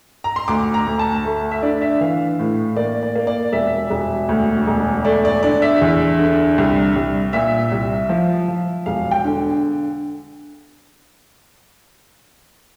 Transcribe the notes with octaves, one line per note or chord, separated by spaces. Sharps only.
A#5
C6
D2 D6
A#5
D2
A5
A3
E5
D3 D5
E5
E3 F5
A2
A#3 D5
D5
A#3
D5
E1 E5
E1
D2
E1
A3 D5
D5
D3 D5
E5
E2
D3
C2
C2
A#2 E5
C2
F3
F3
E1 F5
G5
D3